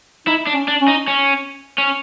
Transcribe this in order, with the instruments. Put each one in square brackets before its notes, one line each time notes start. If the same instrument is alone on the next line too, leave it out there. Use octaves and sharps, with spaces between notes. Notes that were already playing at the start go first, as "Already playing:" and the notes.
[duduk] D#4 [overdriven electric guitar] E4
[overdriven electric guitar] D4
[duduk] C#4
[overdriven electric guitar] D4
[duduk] C#4
[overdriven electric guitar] D#4
C#4
C#4